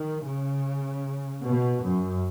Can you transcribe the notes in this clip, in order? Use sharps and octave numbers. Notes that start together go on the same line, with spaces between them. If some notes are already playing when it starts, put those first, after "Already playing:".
Already playing: D#3
C#3
B2
F#2